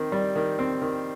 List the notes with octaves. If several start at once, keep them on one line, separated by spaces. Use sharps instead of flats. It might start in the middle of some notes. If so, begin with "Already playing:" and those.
Already playing: D#3 C4
G3
D#3
C4
D#3